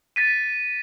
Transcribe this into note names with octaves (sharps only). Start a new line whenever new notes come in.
A6 B6 D#7